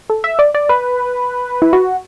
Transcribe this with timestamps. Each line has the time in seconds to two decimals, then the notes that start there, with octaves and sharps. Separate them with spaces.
0.10 A4
0.24 E5
0.39 D5
0.55 D5
0.69 B4
1.62 E4
1.73 F#4